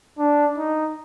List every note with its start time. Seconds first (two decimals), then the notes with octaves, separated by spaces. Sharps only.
0.19 D4
0.58 D#4